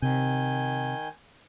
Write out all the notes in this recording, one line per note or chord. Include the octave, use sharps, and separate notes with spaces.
C3 D#3 G#5 G6